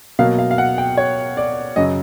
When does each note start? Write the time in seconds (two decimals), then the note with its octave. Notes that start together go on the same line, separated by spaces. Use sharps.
0.19 B2 F#3 A#3 F5
0.39 F5
0.51 F5
0.58 F#5
0.78 G5
0.97 C#5
1.37 D5
1.76 F#2 C#3 F#3 D#5